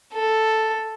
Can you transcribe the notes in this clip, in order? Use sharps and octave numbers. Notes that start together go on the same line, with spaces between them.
A4